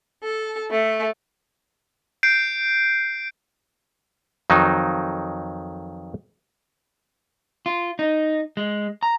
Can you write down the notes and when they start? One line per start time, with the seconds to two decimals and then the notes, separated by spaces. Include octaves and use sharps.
0.22 A4
0.70 A3
2.23 G6 C7 D7
4.50 F2 D#3 F#3 D#4
7.66 F4
7.99 D#4
8.57 G#3
9.03 A#5